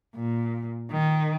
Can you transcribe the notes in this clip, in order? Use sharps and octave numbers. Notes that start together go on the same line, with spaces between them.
A#2
D#3